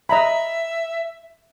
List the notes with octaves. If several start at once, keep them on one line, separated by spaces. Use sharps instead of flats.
D#5 E5 A#5 B5